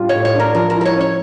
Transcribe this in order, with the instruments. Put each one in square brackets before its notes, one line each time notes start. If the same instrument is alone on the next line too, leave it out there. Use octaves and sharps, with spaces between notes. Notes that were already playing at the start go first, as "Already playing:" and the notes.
Already playing: [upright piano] A2 G3 D4 F4
[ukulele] C#5
[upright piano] A2
[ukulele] C#5
[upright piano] D4
[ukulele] A#4
[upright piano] F3 [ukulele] A#4
[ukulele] A#4
[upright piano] E4
[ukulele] A#4
C#5
[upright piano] C#4 [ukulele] C#5